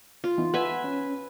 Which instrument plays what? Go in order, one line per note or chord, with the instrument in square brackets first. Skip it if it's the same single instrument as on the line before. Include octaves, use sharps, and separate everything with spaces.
[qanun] F4
[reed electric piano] E3 B3 D#4
[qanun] B4 E5 G#5 [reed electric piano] F#5
[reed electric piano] C#4